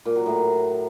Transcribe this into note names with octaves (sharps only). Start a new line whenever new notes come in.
A#2
F#3
A2